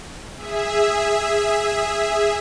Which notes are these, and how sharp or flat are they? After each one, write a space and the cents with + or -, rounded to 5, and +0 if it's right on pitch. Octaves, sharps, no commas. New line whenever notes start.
G#4 -10 E5 +0